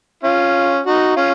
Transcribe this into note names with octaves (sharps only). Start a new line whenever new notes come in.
C#4 F4
D#4 F#4
C#4 F4